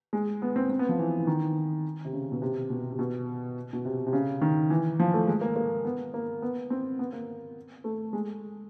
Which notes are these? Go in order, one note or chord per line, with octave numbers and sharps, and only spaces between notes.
G#3
B3
C4
C4
B3
F3
E3
E3
D#3
C3
C#3
B2
C3
B2
C3
B2
B2
C3
C3
C#3
D#3
E3
F3
A3
G#3
A#3
A#3
B3
A#3
B3
C4
B3
A#3
A3
G#3